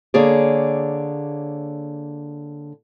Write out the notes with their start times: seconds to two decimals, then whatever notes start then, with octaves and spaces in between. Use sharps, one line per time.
0.14 D3 A#3 G#4 C#5 D5